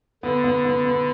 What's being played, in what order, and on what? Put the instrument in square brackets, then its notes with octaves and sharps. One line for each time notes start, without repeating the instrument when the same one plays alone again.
[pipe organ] D3 [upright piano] B3
[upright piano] B3
B3
B3